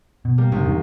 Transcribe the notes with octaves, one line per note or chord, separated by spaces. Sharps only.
B2
G3 A#3
C2 G#2 D3 A#3
E2 G#2 D#3